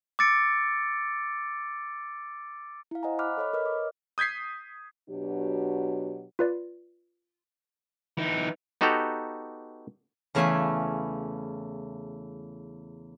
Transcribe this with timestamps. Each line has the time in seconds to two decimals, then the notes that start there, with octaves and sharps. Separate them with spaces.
0.19 D6 E6 A6 C#7 D7
2.91 E4 F5
3.03 C5 D#5 F5 F#5 G#5 A#5
3.19 B5 D6 F6 F#6
3.37 A4 C#5 D#5 B5
3.53 A#4 B4 C#5 D#5 F6
3.66 D6
4.18 D#6 G6 G#6 B6 C7
5.09 B2 F#3 D4 G4
6.39 F4 B4 D5
8.18 E3 D#4
8.81 B3 D#4 F#4 G4 A4 A#5
10.35 E2 C#3 A3 F5 G#5 B5